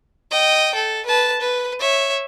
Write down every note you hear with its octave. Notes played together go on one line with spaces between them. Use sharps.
D#5 G5
A4
B4 A5
B4
C#5 E5